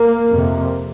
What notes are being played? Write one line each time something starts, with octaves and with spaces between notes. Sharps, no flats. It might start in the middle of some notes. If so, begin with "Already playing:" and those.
Already playing: A#3
F2 C3